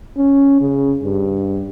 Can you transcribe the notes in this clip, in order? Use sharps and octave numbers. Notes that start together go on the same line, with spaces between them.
C#4
C#3
G2